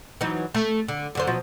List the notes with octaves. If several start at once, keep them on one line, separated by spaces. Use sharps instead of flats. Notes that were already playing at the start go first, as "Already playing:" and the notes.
E3 F#3 D#4
A3
D3
F#2 D3 C5
B2 F3 F#3